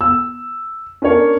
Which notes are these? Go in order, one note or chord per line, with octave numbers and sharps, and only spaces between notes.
E6
C#4 D4 A#4 C#5